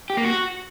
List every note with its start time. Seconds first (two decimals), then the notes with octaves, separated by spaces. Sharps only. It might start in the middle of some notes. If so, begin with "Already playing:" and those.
0.10 G4
0.17 A#3
0.24 F#4